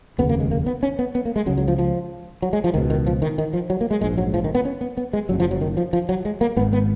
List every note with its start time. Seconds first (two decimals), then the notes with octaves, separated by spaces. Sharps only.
0.18 F1 D#2 C#3 B3
0.29 A#3
0.40 G#3
0.51 A#3
0.66 B3
0.83 C#4
0.99 B3
1.15 B3
1.25 A#3
1.36 G#3
1.46 C#3 F#3
1.50 C#2
1.58 F#3
1.68 F3
1.79 F3
2.42 F#3
2.53 G#3
2.64 F3
2.74 C#2 B2 D#3
2.90 D#3
3.06 F3
3.22 D#3
3.38 D#3
3.53 F3
3.70 F#3
3.81 A#3
3.91 G#3
4.01 A#1 G#2 G#3
4.18 F#3
4.34 F3
4.44 D#3
4.55 B3
4.65 C#4
4.81 B3
4.97 B3
5.13 G#3
5.29 F#1 F#2 C#3 F#3
5.40 F3
5.51 F#3
5.61 D#3
5.77 F3
5.93 F3
6.09 F#3
6.25 G#3
6.41 A#3
6.56 G#1 G#2 B3
6.73 B3